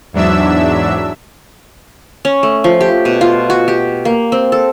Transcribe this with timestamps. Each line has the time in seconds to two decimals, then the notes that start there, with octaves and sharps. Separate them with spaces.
0.13 E2 G#2 F#3 D4 E5 E6
2.25 C#4
2.43 A3
2.64 F3
2.81 G4
3.05 B2
3.21 F4
3.50 F#4
3.68 G4
4.05 A#3
4.32 C4
4.52 A4